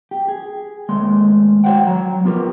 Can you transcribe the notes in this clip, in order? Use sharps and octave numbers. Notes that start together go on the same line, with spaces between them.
G4
G#4
D#2 G#3 A3 C6
F#4 C5 C#5 F#5 G5
F#3 A#5
F3 B3 F4 G4 A#4